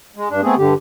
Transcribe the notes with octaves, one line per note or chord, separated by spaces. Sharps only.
G#3
G2 D4
A3 B3 C4 G#4
G2 D3 G4